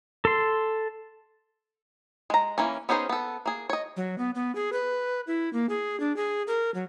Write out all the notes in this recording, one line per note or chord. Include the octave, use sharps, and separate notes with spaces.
A4 C6
G#3 A#5
E3 A#3 C#4
B3 C#4 D#4 G#4 C5
B3 A4
A#3 G#4
C#5 D#5
F#3
B3
B3
G#4
B4
E4
A#3
G#4
D4
G#4
A#4
F#3